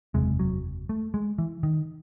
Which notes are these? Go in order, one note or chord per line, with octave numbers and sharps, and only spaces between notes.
F#1 E2 C3 G#3
F#3
A3
G#3
E3
D#3